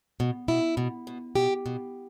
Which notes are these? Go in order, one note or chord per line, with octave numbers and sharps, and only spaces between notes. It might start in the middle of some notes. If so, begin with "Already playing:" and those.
B2
B2 E4
B2
B2
B2 G4
B2